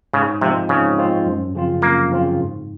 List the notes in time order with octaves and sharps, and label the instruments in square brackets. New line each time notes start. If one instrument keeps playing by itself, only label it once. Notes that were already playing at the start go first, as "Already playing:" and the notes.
[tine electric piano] G#2 [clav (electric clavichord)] C#3
[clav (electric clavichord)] C3 [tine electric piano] F3 G#3 C4 F4
[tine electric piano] G#2 [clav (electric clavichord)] C#3
[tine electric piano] F3 G#3 C4 F4
F#2
C#3 F3 C4 F4
[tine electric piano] F#2 [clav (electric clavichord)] A#3
[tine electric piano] C#3 F3 C4 F4
G#2